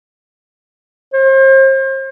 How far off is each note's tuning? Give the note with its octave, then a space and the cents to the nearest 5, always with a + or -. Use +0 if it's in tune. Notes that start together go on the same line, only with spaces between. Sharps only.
C5 +40